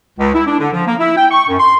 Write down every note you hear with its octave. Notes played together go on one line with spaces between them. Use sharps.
C#2
E4
D4
D3
F3
A#3
E4
G5
C#6
F#2
C6